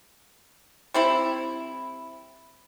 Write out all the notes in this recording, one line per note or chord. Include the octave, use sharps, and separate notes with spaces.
G3 C4 E4